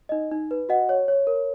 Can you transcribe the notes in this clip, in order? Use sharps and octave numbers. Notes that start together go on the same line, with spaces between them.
D#4 D#5
D#4
B4
F#4 D#5 F#5
C#5
C#5
A#4